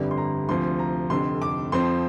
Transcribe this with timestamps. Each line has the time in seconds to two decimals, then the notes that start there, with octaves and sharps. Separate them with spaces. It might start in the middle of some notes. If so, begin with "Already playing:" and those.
Already playing: G1 F2 D3 G3 D5
0.11 C6
0.18 A#5
0.49 D2 C3 F3 C6
0.79 A#5
1.10 F1 F2 D3 C6
1.42 D6
1.72 F2 F3 C4 C6